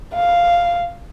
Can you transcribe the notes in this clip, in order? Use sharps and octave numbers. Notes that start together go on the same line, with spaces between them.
F5